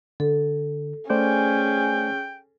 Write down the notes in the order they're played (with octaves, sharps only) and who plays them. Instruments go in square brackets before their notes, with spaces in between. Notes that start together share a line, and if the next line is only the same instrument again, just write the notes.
[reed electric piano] D3 [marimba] A4
[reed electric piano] A3 C5 D5 [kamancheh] C#4 G#4 [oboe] G5